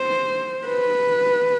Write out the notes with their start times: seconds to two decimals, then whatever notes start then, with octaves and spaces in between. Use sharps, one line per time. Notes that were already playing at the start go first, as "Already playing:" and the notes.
Already playing: C5
0.67 B4